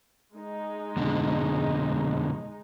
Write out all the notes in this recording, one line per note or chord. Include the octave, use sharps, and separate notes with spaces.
G#3 D#4
F2 B2 D3